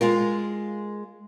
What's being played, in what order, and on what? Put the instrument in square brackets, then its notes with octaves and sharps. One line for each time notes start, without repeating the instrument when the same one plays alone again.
[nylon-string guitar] G#3 F4 A#4